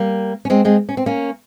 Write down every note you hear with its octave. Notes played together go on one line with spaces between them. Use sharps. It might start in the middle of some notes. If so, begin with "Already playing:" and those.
Already playing: G3 A#3
C#4
G#3 C4
G#3 C4
C#4
C4
A#3 C#4